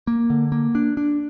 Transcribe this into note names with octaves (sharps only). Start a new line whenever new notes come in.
A#3
D3
A#3
D4
D4